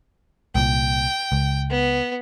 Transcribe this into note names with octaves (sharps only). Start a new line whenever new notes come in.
C2 A#2 G5
C#2
B3